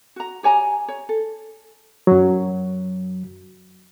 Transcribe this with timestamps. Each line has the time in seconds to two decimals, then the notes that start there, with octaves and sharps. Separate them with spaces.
0.16 F#4 A#5
0.43 G4 C#5 G#5 A#5
0.88 C#5
1.09 A4
2.07 F#2 F#3